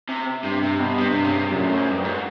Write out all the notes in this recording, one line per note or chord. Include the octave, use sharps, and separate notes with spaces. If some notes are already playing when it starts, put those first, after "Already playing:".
C3
G2 C3
C3
B2
G2 C3
C3
C#3
C3
F#2 A#2
A2
G#2
G2
G#2